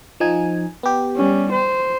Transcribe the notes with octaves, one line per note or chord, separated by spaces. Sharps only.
F3 D#4 G#5
B3 G4
G3 C#4
C5